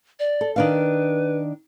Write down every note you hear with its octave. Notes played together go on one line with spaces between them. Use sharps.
D5
A4
D#3 D4 B4 F5